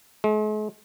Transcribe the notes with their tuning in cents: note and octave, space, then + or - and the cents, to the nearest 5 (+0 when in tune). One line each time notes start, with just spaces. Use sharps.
G#3 +45